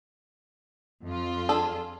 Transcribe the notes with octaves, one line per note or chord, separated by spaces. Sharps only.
F2 F4
D4 G#4 A4